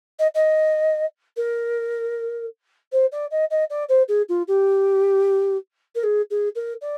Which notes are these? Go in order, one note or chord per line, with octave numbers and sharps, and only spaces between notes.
D#5
D#5
A#4
C5
D5
D#5
D#5
D5
C5
G#4
F4
G4
A#4
G#4
G#4
A#4
D5